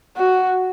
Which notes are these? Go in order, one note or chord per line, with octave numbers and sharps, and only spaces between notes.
F#4